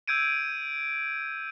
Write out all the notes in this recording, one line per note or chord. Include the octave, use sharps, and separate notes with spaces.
E6 G6 G#6 D7 D#7